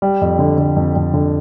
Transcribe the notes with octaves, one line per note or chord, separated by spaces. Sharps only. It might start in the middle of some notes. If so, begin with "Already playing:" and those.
G3
F2
D3
D3
F2
F2
D3